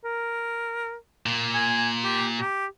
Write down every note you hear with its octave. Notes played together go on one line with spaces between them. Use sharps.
A#4
A#2
G#5
G4
G4